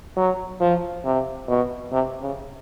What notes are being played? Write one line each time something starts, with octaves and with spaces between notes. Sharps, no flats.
F#3
F3
C3
B2
C3
C#3